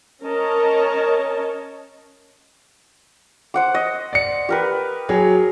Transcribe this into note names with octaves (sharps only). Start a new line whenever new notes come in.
C#4 A#4 C#5 D#5 A5
C5 F#5 D6
D#5
D5 C#7
G4 A#4 B4
F#3 G#4